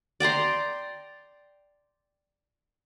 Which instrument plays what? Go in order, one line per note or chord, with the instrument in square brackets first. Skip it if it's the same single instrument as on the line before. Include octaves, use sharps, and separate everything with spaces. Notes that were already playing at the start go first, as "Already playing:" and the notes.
[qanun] D5 G5 A#5 C6